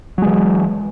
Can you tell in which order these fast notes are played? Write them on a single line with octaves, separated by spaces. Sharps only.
F#3 G#3 E3